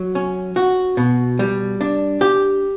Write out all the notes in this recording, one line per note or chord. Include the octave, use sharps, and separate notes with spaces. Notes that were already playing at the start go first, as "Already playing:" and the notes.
Already playing: F#3
C#4
F#4
B2
G3
D4
G4